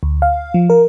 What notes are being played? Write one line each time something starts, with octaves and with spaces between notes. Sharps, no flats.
D2
F5
F3
A#4